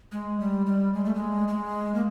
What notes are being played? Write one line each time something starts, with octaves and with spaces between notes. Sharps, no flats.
G#3
G3
G3
G#3
A3
G#3
G#3
A#3